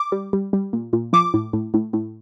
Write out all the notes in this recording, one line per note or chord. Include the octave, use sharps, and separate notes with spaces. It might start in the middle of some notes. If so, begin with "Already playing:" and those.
Already playing: D6
G3
G3
G3
A#2
A#2
F3 D6
A2
A2
A2
A2